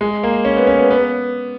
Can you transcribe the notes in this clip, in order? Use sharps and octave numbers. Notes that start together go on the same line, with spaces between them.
G#3
A#3
C#4
B3
C#4
B3
B3